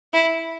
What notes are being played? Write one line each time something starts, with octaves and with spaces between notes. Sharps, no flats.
E4